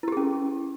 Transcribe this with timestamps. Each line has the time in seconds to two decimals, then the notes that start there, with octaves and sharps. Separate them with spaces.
0.03 E4
0.08 G4
0.12 G#4
0.17 C#4